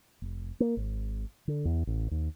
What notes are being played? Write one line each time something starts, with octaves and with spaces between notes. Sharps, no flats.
F1
A#3
G#1
D3
E2
A1
D#2